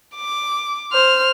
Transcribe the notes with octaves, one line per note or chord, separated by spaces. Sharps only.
D6
C5 F6